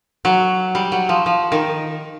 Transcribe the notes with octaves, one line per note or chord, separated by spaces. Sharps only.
F#3
G3
F#3
F3
F3
D#3